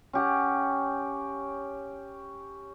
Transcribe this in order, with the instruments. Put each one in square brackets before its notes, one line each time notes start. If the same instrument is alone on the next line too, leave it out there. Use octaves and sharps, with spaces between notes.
[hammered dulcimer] C#4 G4 F#5